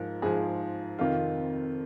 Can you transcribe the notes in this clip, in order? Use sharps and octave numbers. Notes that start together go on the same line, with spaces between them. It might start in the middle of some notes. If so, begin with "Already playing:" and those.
Already playing: G#2 F3 A#4
G#2 F3 G#4
F2 C3 D#3 F4